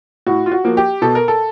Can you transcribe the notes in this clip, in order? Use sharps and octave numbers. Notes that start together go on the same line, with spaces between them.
A2 F#4
F4
F#4
F3 A#3
G4
B2 A4
A#4
A4